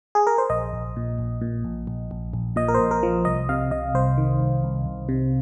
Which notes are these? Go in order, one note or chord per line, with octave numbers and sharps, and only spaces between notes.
G#4
A#4
C5
A#1 D#5
A#1
A#2
A#1
A#2
A#1
A#1
A#1
A#1
A#2 D#5
A#4
A#1 C5
A#4
F3
C2 D#5
C3 F5
C3 D#5
C2 C5
D#3
C2
C2
C2
C3